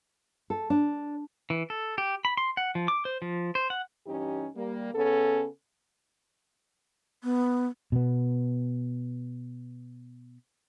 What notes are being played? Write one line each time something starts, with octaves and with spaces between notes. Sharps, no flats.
A4
D4
E3
A4
G4
B5
C6
F#5
F3
D6
C5
F3
C5
F#5
G2 E3 C#4 D#4 G4
G3 A#3
C#3 B3 C#4 A4
B3
B2 B3